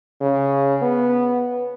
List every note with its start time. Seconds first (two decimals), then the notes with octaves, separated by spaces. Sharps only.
0.21 C#3
0.82 B3